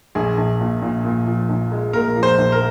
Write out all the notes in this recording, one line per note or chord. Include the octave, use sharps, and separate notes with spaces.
A#1 G#4
A#1
A#2
A#2
A#2
F3
A#1
G#3
A#2 A#4
F3
C5
A#1
A#4